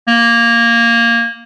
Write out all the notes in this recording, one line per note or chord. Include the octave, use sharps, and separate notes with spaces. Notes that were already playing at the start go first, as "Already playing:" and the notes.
A#3